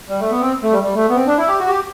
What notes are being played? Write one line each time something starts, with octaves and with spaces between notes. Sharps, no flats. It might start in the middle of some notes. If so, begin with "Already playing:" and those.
G3
A3
B3
C4
A3
G3
G3
A3
B3
C4
D4
E4
G4
F#4
G4